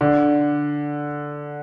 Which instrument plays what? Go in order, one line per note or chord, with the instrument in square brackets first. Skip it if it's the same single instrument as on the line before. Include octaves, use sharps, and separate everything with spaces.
[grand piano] D3